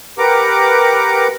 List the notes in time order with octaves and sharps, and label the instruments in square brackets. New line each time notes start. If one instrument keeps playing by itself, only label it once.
[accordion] G4 A#4 B4 F#5 A#5 D6